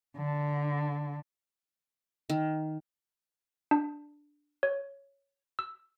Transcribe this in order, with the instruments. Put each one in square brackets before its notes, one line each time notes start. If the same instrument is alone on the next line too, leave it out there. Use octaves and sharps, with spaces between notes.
[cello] D3
[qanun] D#3
[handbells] D4
C#5
E6